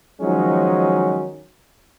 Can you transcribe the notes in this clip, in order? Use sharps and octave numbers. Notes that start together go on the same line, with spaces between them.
D#3 F3 F#3 G#3 C#4 D#4